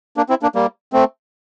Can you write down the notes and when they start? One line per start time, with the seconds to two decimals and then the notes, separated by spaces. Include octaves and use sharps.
0.17 A#3 D4
0.29 C4 E4
0.42 A#3 D4
0.55 G3 A#3
0.93 A3 C4